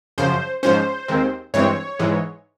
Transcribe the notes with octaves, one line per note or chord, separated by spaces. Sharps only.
F#2 C#3 F3 C5
G#2 F3 G#3 C#4 C5
D#2 D#3 G#3 C4
G2 E3 G#3 C4 C#5
G#2 E3 G#3